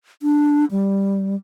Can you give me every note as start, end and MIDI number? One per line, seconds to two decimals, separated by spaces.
0.22 0.65 62
0.71 1.36 55